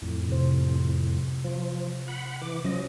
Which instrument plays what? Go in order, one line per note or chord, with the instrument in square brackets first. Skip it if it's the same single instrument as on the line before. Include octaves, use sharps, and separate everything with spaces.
[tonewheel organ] F2 A2
[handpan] C3 C5
[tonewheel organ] F3
F#5 B5
E3 D6
[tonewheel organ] F3 D#5 [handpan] F#3 C#4